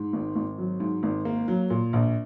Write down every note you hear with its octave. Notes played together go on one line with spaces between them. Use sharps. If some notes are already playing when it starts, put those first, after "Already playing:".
Already playing: G#2
G#1
G#1
F#3
G#2
G#1
A#3
F#3
A#2
A#1